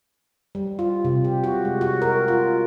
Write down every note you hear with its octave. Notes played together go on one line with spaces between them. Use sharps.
G3
F4
C3
G4
F#4
G#3
F#4
A#4
F4